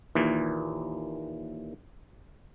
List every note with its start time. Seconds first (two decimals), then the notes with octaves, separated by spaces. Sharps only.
0.15 D#2 A#2 E3